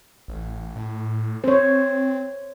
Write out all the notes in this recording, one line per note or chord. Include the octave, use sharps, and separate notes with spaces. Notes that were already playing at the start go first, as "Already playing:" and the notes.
A1
A2
C4 C5 C#5